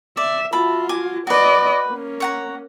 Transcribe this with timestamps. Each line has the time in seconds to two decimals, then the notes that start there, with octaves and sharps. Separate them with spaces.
0.17 D5 E5
0.53 F4 F#4 E5 A5 B5
0.89 G#5 D6
1.27 F#4 B4 D5 D#5
1.88 A#3 C#4
2.20 C#5 F#5 A#5